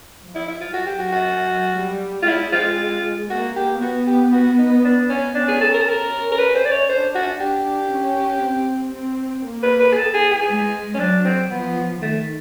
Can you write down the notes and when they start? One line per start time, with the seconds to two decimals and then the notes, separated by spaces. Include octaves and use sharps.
0.22 F3
0.35 E4
0.48 E4
0.60 F4
0.73 F#3 F#4
0.86 G4
0.99 F#4
1.12 F#4
1.76 G3
2.23 F4
2.27 G#3 E4
2.52 F4
3.29 A#3 F#4
3.56 G4
3.81 B3 F#4
4.07 G4
4.32 F#4
4.58 D#4
4.84 D4
5.09 C#4
5.35 C#4 D4
5.48 G#4
5.61 A4
5.74 A#4
5.81 A4
5.86 C#4 A#4
6.31 A#4
6.38 B4
6.54 C5
6.65 D5
6.72 C#5
6.88 D4 C5
7.15 F#4
7.40 D4 G4
7.92 C#4
8.43 C4
8.95 C4
9.46 A#3
9.63 B4
9.80 B4
9.92 G#4
9.96 A4
10.14 G#4
10.31 G#4
10.48 G#3
10.94 C#4
10.99 F#3 D4
11.25 C4
11.51 F3 B3
12.02 D#3 A3